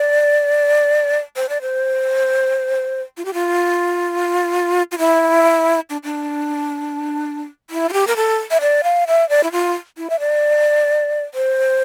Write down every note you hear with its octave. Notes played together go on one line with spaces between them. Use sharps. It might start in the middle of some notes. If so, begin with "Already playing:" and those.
Already playing: D5
C5
D5
C5
F4
G4
F4
F4
E4
D4
D4
E4
F4
G4
A#4
A4
E5
D5
F5
E5
D5
E4
F4
E4
E5
D5
C5